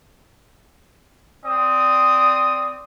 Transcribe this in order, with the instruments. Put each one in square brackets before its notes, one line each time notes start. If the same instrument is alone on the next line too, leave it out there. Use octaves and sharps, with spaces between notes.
[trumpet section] C4 D5 D#6